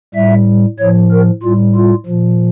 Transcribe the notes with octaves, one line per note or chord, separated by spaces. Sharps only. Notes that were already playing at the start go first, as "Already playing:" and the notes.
A2 G3 E5
A2 F3 C#5
A#4
A2 G3 F4
F4
A#2 F3